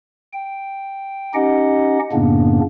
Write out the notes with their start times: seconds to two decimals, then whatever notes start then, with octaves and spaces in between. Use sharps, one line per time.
0.33 G5
1.34 C#4 D#4 G4 D#5 F#5
2.12 F#2 A2 C#3 A#3 B3 D4